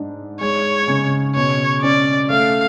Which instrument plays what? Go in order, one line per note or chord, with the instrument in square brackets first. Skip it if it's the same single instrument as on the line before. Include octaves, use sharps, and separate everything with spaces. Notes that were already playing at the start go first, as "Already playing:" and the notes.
Already playing: [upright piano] G#2 D4
[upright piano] G#3 [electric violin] C#5
[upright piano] C#3
[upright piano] B2 [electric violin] C#5
[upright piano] C#4 [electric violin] D5
[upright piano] A3 [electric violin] F5